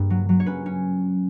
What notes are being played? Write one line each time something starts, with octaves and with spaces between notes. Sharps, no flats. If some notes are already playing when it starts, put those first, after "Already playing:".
Already playing: G2 A#3
F#3
F#3
C#5
C#4 B4
C#4